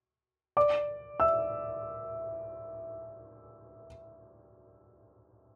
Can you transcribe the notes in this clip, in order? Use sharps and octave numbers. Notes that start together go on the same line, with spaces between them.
D5 D6
E5 E6